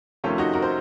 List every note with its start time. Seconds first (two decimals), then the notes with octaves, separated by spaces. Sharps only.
0.24 F2 C3 D#3 A3 C#4 F4
0.38 D#4 F#4
0.53 F#4 A#4
0.62 C5